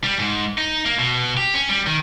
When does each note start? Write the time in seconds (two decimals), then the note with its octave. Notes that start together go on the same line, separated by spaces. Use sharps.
0.04 G3
0.19 G#2
0.58 D#4
0.86 A#3
0.99 B2
1.37 G4
1.54 C#4
1.69 G3
1.87 D#3